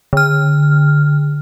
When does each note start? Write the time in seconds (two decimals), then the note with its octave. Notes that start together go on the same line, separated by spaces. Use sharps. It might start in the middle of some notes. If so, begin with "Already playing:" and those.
0.13 D3 F6